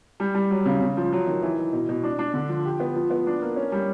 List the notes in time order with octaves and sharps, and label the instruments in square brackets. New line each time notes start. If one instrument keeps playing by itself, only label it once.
[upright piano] G3
G3
F#3
C#3
C#3
F3
F#3
D#3
E3
E3
B2
B2
D4
D4
D3
F3
G4
B3
F3
B3
D4
A#3
C#4
G3